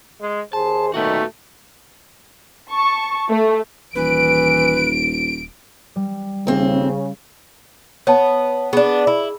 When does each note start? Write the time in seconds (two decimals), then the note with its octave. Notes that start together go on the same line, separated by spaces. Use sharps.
0.21 G#3
0.53 D#2 G#4 C5 A5
0.94 F#2 A#2 D#3 A3 F#4 B4
2.69 A5 C#6
3.29 A3
3.95 D#1 E3 B4 D7
5.96 G3
6.47 D#1 F2 C#3 C4
8.07 B3 C#5 A5
8.73 B3 D4 G#4
9.07 E4